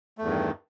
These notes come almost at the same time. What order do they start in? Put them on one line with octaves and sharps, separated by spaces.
A3 E2 G2 D#3